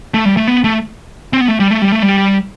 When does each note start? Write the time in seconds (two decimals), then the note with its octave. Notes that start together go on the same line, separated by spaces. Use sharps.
0.14 A3
0.25 G3
0.37 A3
0.47 B3
0.64 A3
1.33 C4
1.41 B3
1.48 A3
1.60 G3
1.71 A3
1.82 G3
1.92 A3
2.02 G3